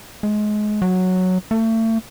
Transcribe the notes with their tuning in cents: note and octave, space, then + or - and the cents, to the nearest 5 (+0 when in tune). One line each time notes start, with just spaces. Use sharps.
G#3 +25
F#3 -5
A3 +35